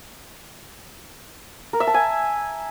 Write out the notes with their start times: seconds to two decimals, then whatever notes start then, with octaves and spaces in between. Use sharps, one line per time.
1.73 A#4
1.80 E5
1.87 A5
1.94 G#5